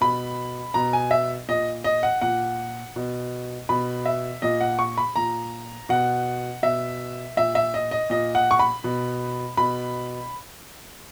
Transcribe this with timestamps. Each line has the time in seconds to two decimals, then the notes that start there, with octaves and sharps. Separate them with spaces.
0.01 B2 B5
0.74 B2 A#5
0.93 G#5
1.11 E5
1.49 A#2 D#5
1.84 D#5
2.03 F#5
2.22 A#2 F#5
2.96 B2
3.69 B2 B5
4.06 E5
4.42 A#2 D#5
4.61 F#5
4.79 C#6
4.98 B5
5.16 A#2 A#5
5.89 B2 F#5
6.63 B2 E5
7.37 A#2 E5
7.55 E5
7.74 D#5
7.91 D#5
8.10 A#2 D#5
8.35 F#5
8.51 C#6
8.59 B5
8.84 B2
9.57 B2 B5